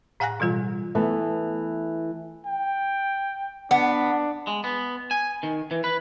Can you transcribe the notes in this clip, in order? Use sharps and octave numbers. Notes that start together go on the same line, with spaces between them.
A2 F5 F#5 G#5 F#6 A#6
B2 E3 G3 F4
E3 A3 B3
G5
B3 D4
G#3
B3
G#5
D#3
E3
B4